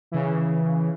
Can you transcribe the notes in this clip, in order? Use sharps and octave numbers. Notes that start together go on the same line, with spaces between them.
C#3 E3